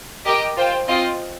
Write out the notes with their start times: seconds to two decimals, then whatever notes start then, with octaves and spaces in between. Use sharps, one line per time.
0.25 G4 A#4 D#5 G5
0.57 F4 C5 G5
0.88 C4 F4 D#5